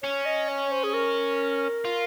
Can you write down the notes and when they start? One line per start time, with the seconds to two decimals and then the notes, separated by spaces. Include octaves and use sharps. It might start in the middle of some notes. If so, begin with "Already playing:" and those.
0.03 C#4 C#5
0.26 D#5
0.49 C#5
0.72 C5
0.84 G#4
0.94 A#4
1.85 F4